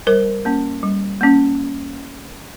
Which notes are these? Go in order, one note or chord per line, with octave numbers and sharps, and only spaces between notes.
G3 A#4 C5
A#3 C#4
G3
A#3 C#4